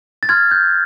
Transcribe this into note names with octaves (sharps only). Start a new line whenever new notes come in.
A6
C6 F6 G#6
G6